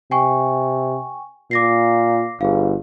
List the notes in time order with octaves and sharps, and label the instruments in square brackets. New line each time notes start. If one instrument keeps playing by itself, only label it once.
[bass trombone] C3 [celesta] G5 G#5 C#6
[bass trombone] A#2 [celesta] D6 A#6 C7
[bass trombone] G1 [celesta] G#4 F5